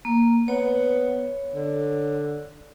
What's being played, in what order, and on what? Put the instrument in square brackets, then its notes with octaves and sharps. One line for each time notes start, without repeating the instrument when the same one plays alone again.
[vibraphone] A#3
[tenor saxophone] B3 [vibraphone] C#5
[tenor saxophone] D3